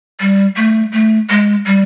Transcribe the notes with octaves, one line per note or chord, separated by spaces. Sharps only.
G3
A3
A3
G#3
G3